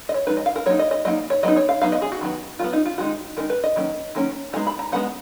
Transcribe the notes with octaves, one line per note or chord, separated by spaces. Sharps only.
D#5
C#5
F3 G#3 D#4 B4
D#5
F5
A#4
F#3 A#3 D#4 C#5
D#5
D#5
F#3 A#3 D#4 D#5
C#5
F#3 B3 D#4 D#5
C#5
F5
F#3 B3 D#4 F5
D#5
G#4
F#4
D#3 F#3 B3
D#3 F#3 B3 F4
D#4
F4
D#3 G#3 D#4 F#4
D#3 G#3 D#4 A#4
B4
D#5
D#3 F#3 A#3 C#4
D#3 F#3 A#3 C#4
G#3 B3 D#4 A#5
B5
A#5
G#3 B3 D#4 F#5